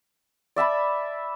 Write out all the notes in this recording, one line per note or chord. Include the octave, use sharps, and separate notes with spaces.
D5 E5 A5 B5